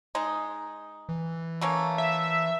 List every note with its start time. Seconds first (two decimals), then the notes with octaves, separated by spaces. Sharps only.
0.15 G#3 D#4
1.09 E3
1.61 A3 A#3 C#4
1.98 E5